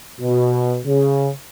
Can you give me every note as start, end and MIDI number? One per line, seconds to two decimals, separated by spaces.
0.21 0.79 47
0.86 1.30 49